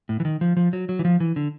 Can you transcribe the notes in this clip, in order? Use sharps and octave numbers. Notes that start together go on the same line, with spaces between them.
A2
E3
D#3
F3
F3
F#3
F#3
E3
F3
E3
D3